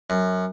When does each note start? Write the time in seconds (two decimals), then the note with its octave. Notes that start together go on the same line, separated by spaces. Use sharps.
0.10 F#2